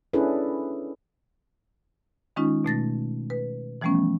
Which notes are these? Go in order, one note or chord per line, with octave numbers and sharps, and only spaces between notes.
C#4 D4 E4 G#4 A4 B4
D#3 G#3 C#4 D#4 F4
B2 A3 A6 A#6
B4
E3 F3 G3 A3 B3 C#4